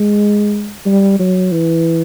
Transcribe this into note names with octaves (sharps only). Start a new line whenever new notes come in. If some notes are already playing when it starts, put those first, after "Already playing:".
Already playing: G#3
G3
F#3
E3